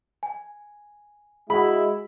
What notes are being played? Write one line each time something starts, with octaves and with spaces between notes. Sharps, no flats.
G#5
G#3 E4 F#4 G#4 B5